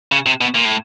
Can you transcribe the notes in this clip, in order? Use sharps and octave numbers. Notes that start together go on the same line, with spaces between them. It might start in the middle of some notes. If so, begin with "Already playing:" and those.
C#3
C3
B2
A#2
A2